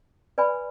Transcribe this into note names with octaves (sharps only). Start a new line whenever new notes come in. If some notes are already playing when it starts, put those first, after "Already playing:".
B4 D5 G#5 B5